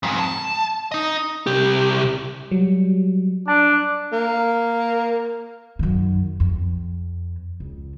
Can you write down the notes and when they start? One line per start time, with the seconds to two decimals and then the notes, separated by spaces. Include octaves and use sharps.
0.03 F2 G#2
0.20 A5
0.92 D#4 D#5
1.47 C2 G4
2.51 F#3 G3
3.48 D4 A5
4.12 A#3
5.79 F#2 D#3
6.40 F2
7.60 C#2